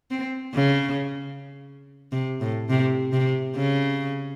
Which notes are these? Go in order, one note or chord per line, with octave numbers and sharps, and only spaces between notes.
C4
C#3
C3
A2
C3
C3
C#3